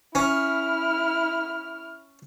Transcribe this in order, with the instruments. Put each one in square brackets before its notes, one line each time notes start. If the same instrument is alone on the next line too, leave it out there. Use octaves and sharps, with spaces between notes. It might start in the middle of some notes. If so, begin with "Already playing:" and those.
[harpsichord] C#4 [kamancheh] E4 F6